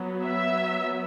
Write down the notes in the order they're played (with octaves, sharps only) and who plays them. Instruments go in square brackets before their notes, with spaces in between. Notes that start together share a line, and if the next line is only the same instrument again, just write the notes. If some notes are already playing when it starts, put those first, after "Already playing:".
Already playing: [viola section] F#3 B3
E5